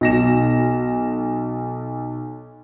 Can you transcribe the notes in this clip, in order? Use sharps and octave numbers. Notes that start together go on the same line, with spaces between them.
B1 A#6 E7